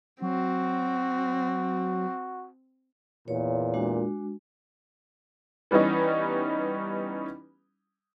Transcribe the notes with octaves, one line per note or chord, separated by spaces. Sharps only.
F#3 C4 F#4
E2 A#2 C#5
G#3 D4 F#4
E3 G3 B3 C#4 D#4